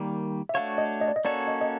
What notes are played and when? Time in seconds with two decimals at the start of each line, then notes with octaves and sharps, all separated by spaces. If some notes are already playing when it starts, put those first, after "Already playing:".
Already playing: D#3 G3 A#3
0.49 E5
0.54 A3 D4 F#4 A4 C#5 F5
0.78 D#5
1.01 D#5
1.08 D5
1.16 D#5
1.25 A#3 C#4 F#4 A4 C#5 D5
1.48 D#5
1.61 D#5